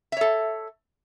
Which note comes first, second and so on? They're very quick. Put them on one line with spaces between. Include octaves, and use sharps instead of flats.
E5 C#5 A4